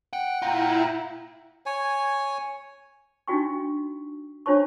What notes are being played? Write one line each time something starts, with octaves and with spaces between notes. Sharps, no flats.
F#5 G5
A#2 E4 F4 G5 A#5
C#5 G#5
D4 D#4 F4 F#4 G5 C#6
D4 F4 C5 C#5 A5 C#6